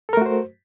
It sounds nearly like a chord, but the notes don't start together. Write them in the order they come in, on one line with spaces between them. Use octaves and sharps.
A4 A#4 A3 F#4 C5